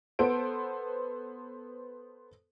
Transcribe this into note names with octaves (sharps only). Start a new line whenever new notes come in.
B3 A4 C5 D7